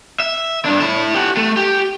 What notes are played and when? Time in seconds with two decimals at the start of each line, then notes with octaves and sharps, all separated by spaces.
0.20 E5
0.65 G2 D4
0.80 E4 A4
1.15 G4 F#5
1.37 A3
1.57 G4